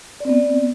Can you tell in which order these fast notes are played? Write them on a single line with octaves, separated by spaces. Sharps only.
D5 C4 B3